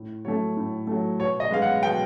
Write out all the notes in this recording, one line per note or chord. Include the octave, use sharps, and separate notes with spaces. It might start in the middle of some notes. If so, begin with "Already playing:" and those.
Already playing: A2
F#3 A3 C#5
A2
F#3 A3
B2 C#5
D#5
G#3 B3 F5
F#5
B2 G5